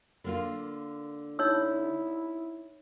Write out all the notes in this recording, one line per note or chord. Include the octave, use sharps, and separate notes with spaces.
D3 A#3 F4
D#4 E4 C#5 E6